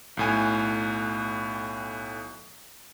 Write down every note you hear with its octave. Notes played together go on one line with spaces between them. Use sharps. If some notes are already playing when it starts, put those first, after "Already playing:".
B1 A2 G#5